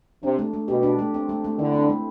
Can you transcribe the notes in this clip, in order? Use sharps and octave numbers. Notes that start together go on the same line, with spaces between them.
C3 D4
A3
A3
B2 G4
D4
A3
C4
A3
A3
D3 E4
C4
A3